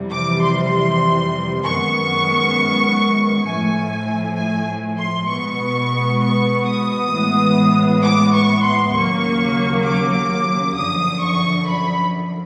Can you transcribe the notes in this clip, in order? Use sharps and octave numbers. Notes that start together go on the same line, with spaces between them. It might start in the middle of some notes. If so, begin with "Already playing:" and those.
Already playing: F2 C3 E3 G3
D6
C6
F#2 D#3 G#3 B3 C#6
A2 F3 A3 G#5
G#5
C6
B2 G#3 B3 C#6
C#6
D#6
A2 E3 G#3 B3
D6
C#6
C6
D#2 C#3 F#3 A#3 C#6
D6
F#2 D3 F3 D#6
C#6
B5